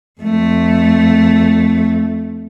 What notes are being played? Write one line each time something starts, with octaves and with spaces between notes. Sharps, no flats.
F2 A3